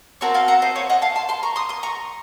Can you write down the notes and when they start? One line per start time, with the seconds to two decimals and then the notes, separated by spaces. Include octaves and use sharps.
0.21 C4 F#4 A4 A#4 C#5
0.34 F5 A5
0.48 F#5 A#5
0.62 C5 D#5
0.76 C#5 F5
0.89 D#5 F#5
1.02 F5 A5
1.16 A5 C6
1.29 A5 C6
1.43 A#5 C#6
1.56 C6 D#6
1.69 C6 D#6
1.83 A#5 C#6